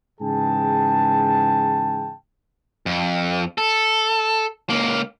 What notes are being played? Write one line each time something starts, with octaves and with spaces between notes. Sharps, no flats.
G#2 C#3 E3 G#4 G5 A5
F2
A4
C#2 A#3